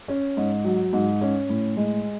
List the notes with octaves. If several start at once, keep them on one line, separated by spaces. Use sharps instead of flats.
C#4
G#2
F#3
G#2
C#4
A2
G#3